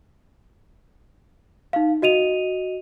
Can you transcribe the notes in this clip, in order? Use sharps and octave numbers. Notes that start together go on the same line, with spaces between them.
D#4 F5
F#4 D#5 D#7 F7